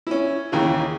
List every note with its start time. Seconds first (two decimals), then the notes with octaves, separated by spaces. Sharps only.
0.07 C#4 E4
0.52 D#2 C#3 E3